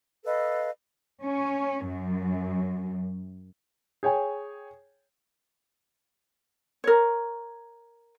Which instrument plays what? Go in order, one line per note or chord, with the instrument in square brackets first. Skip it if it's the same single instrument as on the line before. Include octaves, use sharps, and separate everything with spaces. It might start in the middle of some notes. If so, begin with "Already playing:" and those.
[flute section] A4 B4 D#5 F5
[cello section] C#4
F#2
[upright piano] G#4 C#5 G5 G#5
[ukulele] A#4 C#5